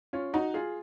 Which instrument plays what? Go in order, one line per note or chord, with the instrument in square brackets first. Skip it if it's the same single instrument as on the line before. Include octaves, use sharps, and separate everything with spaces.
[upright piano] C#4 F4
D#4 F#4
F4 G#4